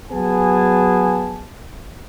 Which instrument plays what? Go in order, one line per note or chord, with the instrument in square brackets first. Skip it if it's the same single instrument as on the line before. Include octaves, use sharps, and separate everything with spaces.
[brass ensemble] F#3 B3 G#4 G#5 A5